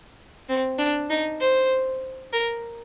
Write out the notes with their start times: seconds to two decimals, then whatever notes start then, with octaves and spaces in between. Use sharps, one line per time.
0.49 C4
0.79 D4
1.10 D#4
1.41 C5
2.33 A#4